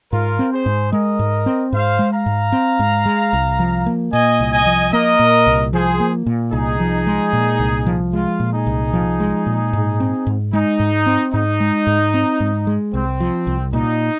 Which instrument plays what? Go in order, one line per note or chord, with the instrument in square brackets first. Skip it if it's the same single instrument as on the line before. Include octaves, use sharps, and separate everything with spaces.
[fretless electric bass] G#2 [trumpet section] F4 A#4
[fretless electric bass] C4
[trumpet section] G#4 C5
[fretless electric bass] G#2
[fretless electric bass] G#3 [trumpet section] A#4 D#5
[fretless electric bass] G#2
C4
[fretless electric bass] G#2 [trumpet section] C5 F5
[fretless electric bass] G#3
[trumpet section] F5 A#5
[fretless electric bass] G#2
C4
G#2
G#3
C2
F3
A#3
[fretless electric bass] A#2 [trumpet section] D#5 G#5
[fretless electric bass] C2
[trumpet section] D#5 G#5
[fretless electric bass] F3
[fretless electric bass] A#3 [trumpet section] A#4 D#5
[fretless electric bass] A#2
C2
[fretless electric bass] F3 [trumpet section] G#4 C5
[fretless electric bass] A#3
A#2
[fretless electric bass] C2 [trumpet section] D#4 G#4
[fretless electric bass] F3
G#3
A#2
C2
F3
[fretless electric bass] G#3 [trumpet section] F4
[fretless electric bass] A#2
[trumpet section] D#4 G#4
[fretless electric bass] C2
F3
G#3
A#2
G#2
C4
G#2
[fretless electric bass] G#3 [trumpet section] D#4
[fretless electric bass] G#2
C4
[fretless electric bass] G#2 [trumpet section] D#4
[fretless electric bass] G#3
G#2
C4
G#2
G#3
[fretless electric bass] C2 [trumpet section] C4
[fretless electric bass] F3
C2
[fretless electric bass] A#2 [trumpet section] D#4